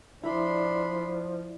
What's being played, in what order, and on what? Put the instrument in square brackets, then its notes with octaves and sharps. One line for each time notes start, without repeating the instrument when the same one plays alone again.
[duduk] F3 [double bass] D4 [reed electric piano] E4 D5 [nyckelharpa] B5 C6